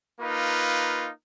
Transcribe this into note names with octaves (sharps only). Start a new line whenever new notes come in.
A#3 D#4 F4 B4